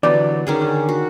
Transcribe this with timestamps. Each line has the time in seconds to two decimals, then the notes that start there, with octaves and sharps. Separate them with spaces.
0.03 D3 E3 F#3 B3 D5
0.47 D#3 C#4 G#4
0.61 D3
0.89 F#4